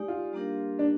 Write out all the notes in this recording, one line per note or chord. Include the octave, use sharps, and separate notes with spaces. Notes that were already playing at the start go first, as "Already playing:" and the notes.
Already playing: G#3 D#4 G4 D5
F4
G3 A#3 D4 G4 A#4
D4